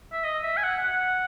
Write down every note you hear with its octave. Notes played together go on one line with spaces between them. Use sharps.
E5
D#5
E5
G#5
F#5
F#5